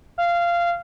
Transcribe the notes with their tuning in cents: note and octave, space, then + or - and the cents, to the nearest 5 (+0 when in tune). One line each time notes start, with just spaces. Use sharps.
F5 -15